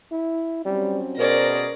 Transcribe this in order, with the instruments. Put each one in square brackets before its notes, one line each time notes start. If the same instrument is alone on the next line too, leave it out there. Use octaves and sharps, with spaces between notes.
[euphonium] E4
[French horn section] F#3 C4 C#4 [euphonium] G3
[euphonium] B2 [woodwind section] C#4 G#4 A#4 [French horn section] C5 [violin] D5 A#6